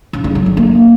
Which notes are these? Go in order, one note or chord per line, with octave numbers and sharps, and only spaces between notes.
C#3
G2
F#3
D3
A#3